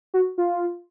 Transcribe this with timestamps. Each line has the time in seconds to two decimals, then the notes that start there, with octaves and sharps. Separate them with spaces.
0.14 F#4
0.38 F4